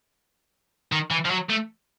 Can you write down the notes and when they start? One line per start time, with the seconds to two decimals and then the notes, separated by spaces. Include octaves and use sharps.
0.92 D#3
1.11 E3
1.25 F3
1.31 F#3
1.50 A3